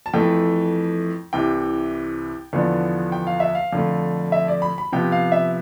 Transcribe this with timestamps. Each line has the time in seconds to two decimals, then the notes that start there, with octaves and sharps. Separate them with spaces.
0.06 A5
0.13 F2 E3 A3 G5
1.33 C2 C3 E3 G5
2.53 E2 D3 F3 B3 D4
3.12 G5
3.27 F5
3.40 E5
3.55 F5
3.73 F2 D3 A3
4.32 E5
4.48 D5
4.62 B5
4.78 B5
4.92 C3 F3 B3 G5
5.12 F5
5.32 E5